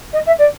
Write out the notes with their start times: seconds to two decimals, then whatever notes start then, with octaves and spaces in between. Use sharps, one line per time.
0.13 D#5
0.26 E5
0.39 D5